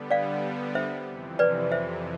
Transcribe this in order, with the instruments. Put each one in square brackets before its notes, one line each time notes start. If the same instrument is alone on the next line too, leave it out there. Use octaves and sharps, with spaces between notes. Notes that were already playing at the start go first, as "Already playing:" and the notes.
Already playing: [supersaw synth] D3 G3 B3
[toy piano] D5 F5
C5 E5
[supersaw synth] F2 C3 E3
[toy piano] B4 D5
C5 E5